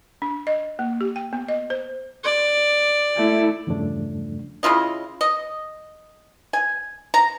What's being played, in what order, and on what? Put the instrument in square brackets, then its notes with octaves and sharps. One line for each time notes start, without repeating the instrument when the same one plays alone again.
[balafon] D4
D#5
A#3
G4
G5
B3
D#5
C5
[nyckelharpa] D5
[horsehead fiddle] A3 E4
[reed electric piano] E2 G2 C#3 F3 A3 D4
[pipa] C#3 E4 F4 D#5
D#5
G#5
A#5